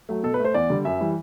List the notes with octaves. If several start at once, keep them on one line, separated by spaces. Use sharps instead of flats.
F#3 A3
B2 A4
B4
A3
C5
E2 D5
D3 G3
F#2 E5
E3 G3